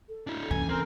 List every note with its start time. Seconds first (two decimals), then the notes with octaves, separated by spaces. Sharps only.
0.08 A4
0.27 D4 E4
0.51 E3 C#4 A4 G#5
0.69 C4 A#4